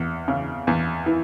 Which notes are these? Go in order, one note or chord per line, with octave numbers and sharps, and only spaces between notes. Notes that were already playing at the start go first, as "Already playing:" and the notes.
Already playing: E2
C#3
E2
E3